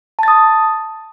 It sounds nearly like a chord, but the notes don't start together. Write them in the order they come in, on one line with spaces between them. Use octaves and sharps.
A5 A6 D#6